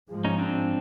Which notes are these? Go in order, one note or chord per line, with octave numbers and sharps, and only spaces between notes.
G#2 F3 G#3
C#4 D#4
C4 D4